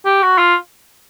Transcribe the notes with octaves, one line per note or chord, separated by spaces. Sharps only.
G4
F#4
F4